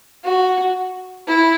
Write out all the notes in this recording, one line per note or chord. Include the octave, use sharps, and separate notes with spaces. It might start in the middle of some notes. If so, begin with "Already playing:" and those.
F#4
E4